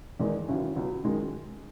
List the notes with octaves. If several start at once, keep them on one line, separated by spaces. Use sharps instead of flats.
E2 D#3 G#3 D#4
D#2 C#3 F#3 C#4 E4
C#2 B2 F#3
F#2 D#3 G#3